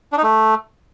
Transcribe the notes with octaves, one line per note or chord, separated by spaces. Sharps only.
D4
D#4
A3